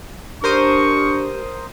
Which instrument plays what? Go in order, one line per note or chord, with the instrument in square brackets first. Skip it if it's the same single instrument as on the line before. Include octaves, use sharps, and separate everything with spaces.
[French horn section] D4 [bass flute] G4 [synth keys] A#4 C5 D#6 [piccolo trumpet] C#6